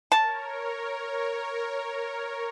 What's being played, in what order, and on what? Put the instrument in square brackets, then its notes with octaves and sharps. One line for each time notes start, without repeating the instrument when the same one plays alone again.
[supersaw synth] A#4 C#5 [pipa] A5